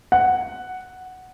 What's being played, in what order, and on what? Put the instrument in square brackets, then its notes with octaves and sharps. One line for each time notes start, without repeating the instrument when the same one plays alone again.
[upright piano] F#5